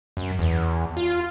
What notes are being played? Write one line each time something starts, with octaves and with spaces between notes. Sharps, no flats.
F#2
E2
F4